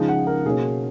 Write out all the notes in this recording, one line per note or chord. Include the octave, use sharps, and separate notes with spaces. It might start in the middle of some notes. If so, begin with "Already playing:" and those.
Already playing: C#3 F3 G#3 D#4
F#5
A#4
B2 A#3 C#4 G#4